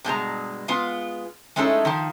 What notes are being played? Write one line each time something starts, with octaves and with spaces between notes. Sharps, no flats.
G2 B2 G#3 A#5
G#3 B3 F4
G#3 A3 C#4 D#4 E4 A4
D#3 F3